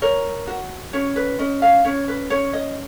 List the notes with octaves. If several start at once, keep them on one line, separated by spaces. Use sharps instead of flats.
A#4 C#5
F#4
C#4 C#5
B4
C#4 D#5
F5
C#4 C#5
B4
C#4 C#5
D#5